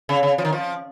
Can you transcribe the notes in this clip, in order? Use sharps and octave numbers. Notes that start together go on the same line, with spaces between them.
C#3
C#3
F3
D#3
F3